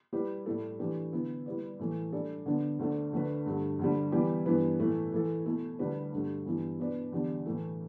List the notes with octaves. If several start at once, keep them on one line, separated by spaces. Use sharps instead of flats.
G3 E4 G4 B4
A2 G3 E4 A4
E3 A3 D4 G4 B4
D3 B3 E4
G3 E4 B4 D5
A2 E3 A3
G3 D4 A4 D5
D3 B3 D4
D2 D3 A3 D4
D2 D3 A3 D4 B4
G2 D3 A3
D2 D3 G3
E3 G3 B3 E4 G4
G2 E3 B3 E4 B4
A2 E3 A3 E4 B4
E3 A3 E4 A4
B2 A3 E4
D2 D3 G3 D4 B4
G2 D3 A3
G2 E3 B3 E4
B2 B3 D4 B4 D5
E2 D3 G3 D4 G4
A2 E3 A3 E4